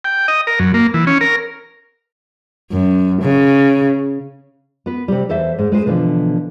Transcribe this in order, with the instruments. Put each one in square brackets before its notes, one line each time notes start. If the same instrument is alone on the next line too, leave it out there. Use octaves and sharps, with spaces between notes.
[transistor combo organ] G5
D#5
A#4
F#2
A#3
E3
C#4
A#4
[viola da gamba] F#2
C#3
[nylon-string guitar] B3 B4
C3 G3
E2 A4 C5 E5
G#2
G#3 B4 C5
B2 D3 E3 F3